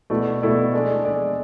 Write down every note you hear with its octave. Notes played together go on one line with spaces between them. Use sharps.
B2 A3 E4 A4 D5
B2 A3 E4 A4 D5
G#3 D4 A4 D5
G#3 D4 A4 D5